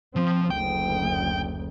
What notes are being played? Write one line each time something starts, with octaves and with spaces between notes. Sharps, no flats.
F3 C4
F#1 D2 G5